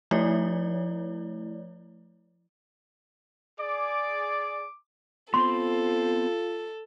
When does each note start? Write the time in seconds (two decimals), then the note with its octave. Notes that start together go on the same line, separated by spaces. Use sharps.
0.11 F3 A3 E4 C#5 D5
3.59 G#4 D5 D6
5.34 B3 C4 F4 A4 C5 C6